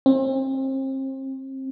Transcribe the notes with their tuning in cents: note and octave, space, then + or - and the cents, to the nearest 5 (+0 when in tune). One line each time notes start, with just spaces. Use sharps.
C4 +35